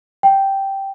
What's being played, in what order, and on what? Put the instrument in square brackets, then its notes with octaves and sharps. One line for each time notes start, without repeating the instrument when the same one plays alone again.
[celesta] G5